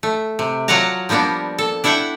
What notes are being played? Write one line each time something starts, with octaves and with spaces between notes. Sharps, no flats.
A3
C3
F#3 F4 D5 F#5 A5 A#5
F3 G3 A#3 B3 D4
A4
D4 E4 E5 F#5 G5